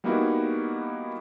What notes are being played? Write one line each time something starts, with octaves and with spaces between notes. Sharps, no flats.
G3 A#3 B3 D#4 E4 F#4